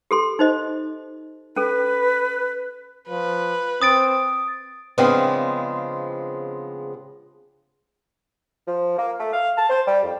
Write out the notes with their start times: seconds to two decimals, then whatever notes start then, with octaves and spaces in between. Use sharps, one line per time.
0.11 G4 A4 C6
0.39 D#4 C5 D#5
1.56 C#4 A4 B4
3.09 F3 B4
3.82 C4 D#6 A6 D7
4.98 C#3 F3 G#3 B3 C4 D4
8.67 F3
8.98 A#3
9.19 A3
9.33 F5
9.57 A5
9.70 C5
9.87 G3
10.03 F2